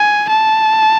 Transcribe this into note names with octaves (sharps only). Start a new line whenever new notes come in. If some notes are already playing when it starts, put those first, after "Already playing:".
Already playing: G#5
A5